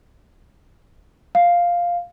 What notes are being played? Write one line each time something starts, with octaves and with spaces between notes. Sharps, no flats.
F5